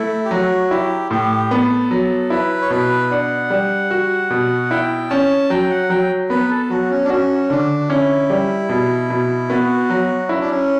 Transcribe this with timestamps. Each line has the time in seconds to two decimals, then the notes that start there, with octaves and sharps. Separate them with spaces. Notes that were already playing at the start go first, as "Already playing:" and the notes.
Already playing: A3 E4
0.25 G4
0.31 F#3 F#4
0.71 E4 G4
1.11 A2 G4
1.51 B3 A4
1.91 F#3
2.30 E4 B4
2.61 C#5
2.70 B2 B4
3.11 D4 F#5
3.50 G3
3.91 F#4
4.30 B2
4.71 E4 G5
5.10 C#4 A5
5.50 F#3 G5
5.70 F#5
5.90 F#3 G5
6.29 B3 B4
6.51 A4
6.69 F#3 F#4
6.90 C#4
7.04 D4
7.10 C#4 F#4
7.50 D3 D4
7.90 C#4 E4
8.30 G3
8.69 B2
9.10 B2
9.49 B3 F#4
9.90 F#3
10.29 C#4 E4
10.40 D4
10.49 C#4